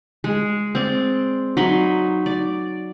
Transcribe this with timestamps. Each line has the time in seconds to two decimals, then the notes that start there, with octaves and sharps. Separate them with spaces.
0.24 G#3
0.75 C4 D5
1.57 F#3 D#4 B5 C6
2.26 D5